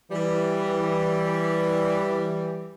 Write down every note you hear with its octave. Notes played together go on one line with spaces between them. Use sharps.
E3 G3